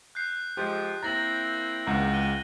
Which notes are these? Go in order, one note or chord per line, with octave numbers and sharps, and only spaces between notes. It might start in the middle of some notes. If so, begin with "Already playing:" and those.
F#6 G6 C7
F3 G#3 G4
A#3 C4 E4 A#5 A6 A#6 F#7
C#2 F#5 A#5
D#7 G7